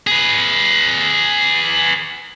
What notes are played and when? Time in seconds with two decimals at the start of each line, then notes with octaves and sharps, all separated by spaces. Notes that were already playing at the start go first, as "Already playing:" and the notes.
0.07 G#4 B4